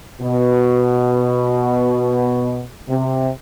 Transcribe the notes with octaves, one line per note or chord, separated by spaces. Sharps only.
B2
C3